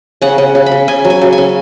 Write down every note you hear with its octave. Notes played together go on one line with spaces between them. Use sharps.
C#3 F#5
C#3
C#3
B5
C#3
C#3 G#5
F#3
G#5
C#3
G#5
C#3